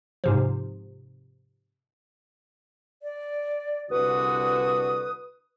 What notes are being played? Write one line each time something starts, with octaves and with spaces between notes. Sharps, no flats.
G#2 C3 F3
D5
C2 D3 F#4 B4 D#6